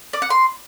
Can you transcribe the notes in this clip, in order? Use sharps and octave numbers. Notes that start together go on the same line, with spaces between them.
D5
F#5
C6